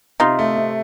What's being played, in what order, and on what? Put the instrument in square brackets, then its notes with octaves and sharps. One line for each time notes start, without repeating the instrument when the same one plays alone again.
[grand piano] C3 [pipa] D#4 F4
[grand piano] A3
C3